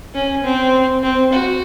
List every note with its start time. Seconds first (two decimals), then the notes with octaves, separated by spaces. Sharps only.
0.14 C#4
0.44 C4
1.03 C4
1.33 F#4